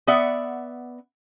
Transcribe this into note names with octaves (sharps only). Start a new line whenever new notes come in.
B3 D5 E5 F#5